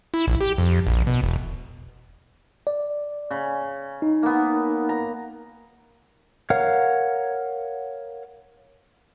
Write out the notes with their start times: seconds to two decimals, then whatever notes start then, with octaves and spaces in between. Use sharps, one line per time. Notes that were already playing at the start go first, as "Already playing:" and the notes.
0.14 E4
0.27 A#1
0.41 G4
0.58 F2
0.87 A#1
1.07 B2
1.23 E1
2.67 D5
3.31 C#3
4.02 D#4
4.23 A#3 B3
4.89 A#5
6.50 A#4 C#5 F5 F#5 F6